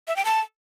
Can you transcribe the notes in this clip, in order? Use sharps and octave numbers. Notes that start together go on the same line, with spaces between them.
E5
G5
A5